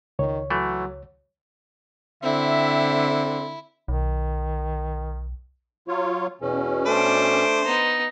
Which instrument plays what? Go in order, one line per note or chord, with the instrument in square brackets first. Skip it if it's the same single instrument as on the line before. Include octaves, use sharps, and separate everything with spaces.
[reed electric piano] C#2 C#5 [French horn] D#3
[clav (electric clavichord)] E3 A3 [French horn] F#3
[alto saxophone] D3 [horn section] C4 [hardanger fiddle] E4 [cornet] E5
[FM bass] B1 [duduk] D#3
[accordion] F#3 F4 C#5
[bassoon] E2 [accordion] B2 C#4
[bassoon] A3 [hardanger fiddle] D4 D6 [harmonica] C5
[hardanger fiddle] B3 D#4